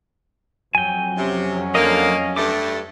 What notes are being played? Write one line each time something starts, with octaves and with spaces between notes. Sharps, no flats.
F2 F#3 G5 G#5
C3 C#4
D3 A#3 D#5 F5
G2 A3 D6